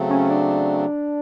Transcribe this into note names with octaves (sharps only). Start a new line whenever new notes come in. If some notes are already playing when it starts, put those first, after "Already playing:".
Already playing: C#3 F#3 A3 C4
C#4
D4